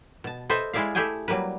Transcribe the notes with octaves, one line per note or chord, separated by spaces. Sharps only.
B2 A5
A4 B4 C5 D#5 E5
G#3 E4 G#4 D5 E5 F5
A3 E4 G4 G#4 G5 G#5
F#3 G3 A#3 B4